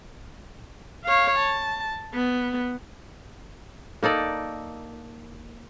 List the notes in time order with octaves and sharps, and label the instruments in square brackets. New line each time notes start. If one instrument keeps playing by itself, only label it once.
[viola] C#5 F5
A5
B3
[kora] A#3 D#4 A4 D5